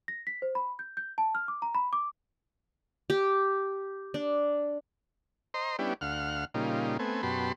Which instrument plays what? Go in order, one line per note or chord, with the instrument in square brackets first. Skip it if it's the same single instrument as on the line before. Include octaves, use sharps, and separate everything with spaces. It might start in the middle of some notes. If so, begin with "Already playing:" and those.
[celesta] A#6
B6
C5
B5
G6
G6
A5
F6
D6
A#5
B5
D6
[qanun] G4
D4
[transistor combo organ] C5 D#5 A#5 C6
G3 B3 C#4 D4 E4 G4
D2 F5 F#5 F6
A#2 C#3 G3 D#4 F4
A3 B3 C4 G#5
F#2 B2 G4 A5 B5 C6